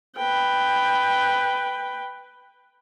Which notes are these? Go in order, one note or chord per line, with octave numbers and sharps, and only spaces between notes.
B4 G5